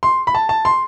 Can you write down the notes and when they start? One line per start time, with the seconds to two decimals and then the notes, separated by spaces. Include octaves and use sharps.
0.03 C6
0.27 B5
0.35 A5
0.49 A5
0.65 C6